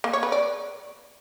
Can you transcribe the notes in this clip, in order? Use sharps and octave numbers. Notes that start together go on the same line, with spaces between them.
A#3
C#5
B4
D5